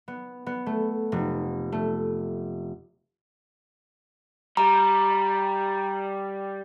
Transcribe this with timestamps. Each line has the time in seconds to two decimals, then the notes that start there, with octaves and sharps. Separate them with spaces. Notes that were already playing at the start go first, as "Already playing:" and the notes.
0.08 B3
0.46 B3
0.66 A3
1.12 F1
1.72 A3
4.57 G3 A#5